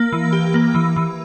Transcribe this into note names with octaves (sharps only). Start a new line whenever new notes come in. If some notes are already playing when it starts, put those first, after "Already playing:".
Already playing: A#3
E3
G4
A#3
E3
E3